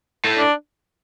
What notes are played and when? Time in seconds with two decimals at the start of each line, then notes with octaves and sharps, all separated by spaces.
0.24 A2
0.39 D4